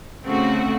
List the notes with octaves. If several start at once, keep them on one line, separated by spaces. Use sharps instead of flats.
C#3 A3 C4 F#4